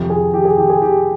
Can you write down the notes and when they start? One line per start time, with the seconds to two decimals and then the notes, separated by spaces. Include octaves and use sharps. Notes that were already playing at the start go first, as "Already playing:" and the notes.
Already playing: F2 C3 F3
0.10 G#4
0.34 G4
0.45 G#4
0.58 G4
0.70 G#4
0.82 G4